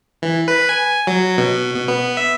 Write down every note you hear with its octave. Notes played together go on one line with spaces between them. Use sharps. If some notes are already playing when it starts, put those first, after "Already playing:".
E3
B4
G#5
F#3
B2
B2
B3
E5